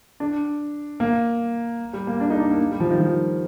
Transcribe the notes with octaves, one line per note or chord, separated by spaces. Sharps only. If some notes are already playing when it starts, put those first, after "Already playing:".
D4
A#3
G3
A#3
D4
D#4
D4
A#3
G3
F3
D#3
F3